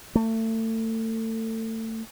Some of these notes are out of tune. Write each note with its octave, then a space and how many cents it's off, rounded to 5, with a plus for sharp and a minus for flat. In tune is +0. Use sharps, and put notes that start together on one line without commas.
A3 +30